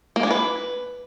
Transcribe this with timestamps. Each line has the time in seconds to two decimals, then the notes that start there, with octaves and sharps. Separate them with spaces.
0.16 A#3
0.23 D4
0.31 B4